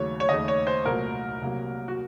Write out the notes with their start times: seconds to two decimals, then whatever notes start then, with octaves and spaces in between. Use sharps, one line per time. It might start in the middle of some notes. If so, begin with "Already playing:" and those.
Already playing: D#2 C#3 F#3 A3 C#5
0.20 C#5
0.29 D#2 C#3 A3 D#5
0.48 C#5
0.67 C5
0.86 C2 A#2 F#3 A3 A#4
1.41 C2 C3 F#3 A#3
1.88 F#4